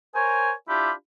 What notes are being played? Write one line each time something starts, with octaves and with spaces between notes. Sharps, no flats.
A#4 C5 C#5 G#5
D4 E4 F4 G4 B5